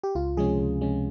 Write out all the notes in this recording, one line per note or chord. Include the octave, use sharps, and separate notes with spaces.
G4
C#2 F4
C3 F3 G#3 C#4 G#4
C#2
C3 F3 G#3 C#4